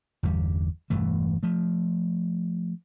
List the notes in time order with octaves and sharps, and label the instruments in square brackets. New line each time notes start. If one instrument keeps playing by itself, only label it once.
[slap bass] G1 E2 G3
E1 G2 E3 A3
F3 A3